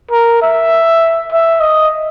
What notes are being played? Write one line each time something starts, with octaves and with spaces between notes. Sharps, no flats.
A#4
E5
E5
D#5